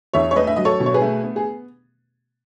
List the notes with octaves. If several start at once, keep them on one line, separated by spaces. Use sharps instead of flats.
E2 C#5 E5
C#5
A3 B4 D#5
E5
F#3 D#5
A4 C#5
B2
C#5
G#4 B4
A3
B3
G#4